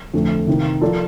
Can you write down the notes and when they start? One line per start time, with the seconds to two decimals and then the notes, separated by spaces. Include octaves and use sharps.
0.14 F2 D3 A3
0.47 C3 D#3 A#3
0.81 F3 A#3 F4 A4 D5